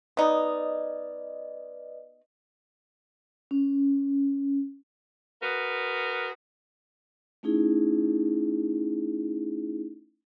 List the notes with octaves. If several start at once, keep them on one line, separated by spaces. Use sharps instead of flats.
B3 D#4 B4 D5 D#5
C#4
F#4 G#4 A#4 B4
A3 C#4 D#4 E4 G#4